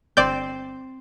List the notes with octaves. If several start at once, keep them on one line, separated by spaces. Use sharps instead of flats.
G1 C4 C5 D5 G6